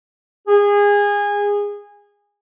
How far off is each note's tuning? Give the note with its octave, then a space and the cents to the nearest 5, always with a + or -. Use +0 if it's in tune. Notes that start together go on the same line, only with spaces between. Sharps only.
G#4 -25